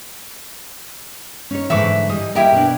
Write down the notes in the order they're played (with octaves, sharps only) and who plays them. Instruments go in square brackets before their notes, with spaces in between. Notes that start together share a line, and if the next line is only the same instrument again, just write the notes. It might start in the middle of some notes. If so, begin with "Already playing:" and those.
[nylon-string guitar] C#4 D#4 C#5
[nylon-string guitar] G#2 D3 E3 [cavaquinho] E5 C#6 D6
[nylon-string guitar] E3 G3 [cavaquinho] D#5
[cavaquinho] E4 G4 A#4 [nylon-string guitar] D#5
[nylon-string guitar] B2 D4